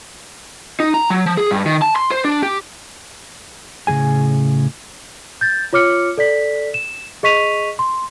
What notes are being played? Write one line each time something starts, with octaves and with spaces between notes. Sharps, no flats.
D#4
A#5
F#3
F3
G#4
G2
D#3
A5
C6
C5
D4
G4
A2 C#3 F3 G#4 G#5
G6 A6
F4 C#5 D6 F6 C#7
A4 D5 B6
E7
G#4 D#5 C#6 B6 D#7 F7
C6